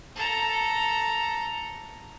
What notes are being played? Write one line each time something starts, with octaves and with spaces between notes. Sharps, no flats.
A4 A#5